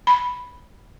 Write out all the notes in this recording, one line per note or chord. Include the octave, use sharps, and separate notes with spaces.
B5